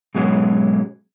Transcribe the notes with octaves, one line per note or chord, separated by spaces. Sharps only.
G#2 B2 F#3 G#3 C#4